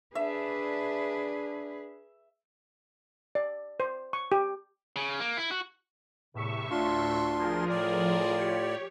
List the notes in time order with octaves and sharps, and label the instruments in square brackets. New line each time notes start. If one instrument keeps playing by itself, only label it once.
[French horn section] D4 [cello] G#4 B4 [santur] E5
[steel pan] D5
C5
C#6
G4
[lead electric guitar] C#3
A#3
E4
F#4
[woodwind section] E2 C3 [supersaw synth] A2 E5 C#6
[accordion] D2 D4 C6 [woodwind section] F4
[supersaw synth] F3 G#4 A#4
[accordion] A2 D5
[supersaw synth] G4 C#5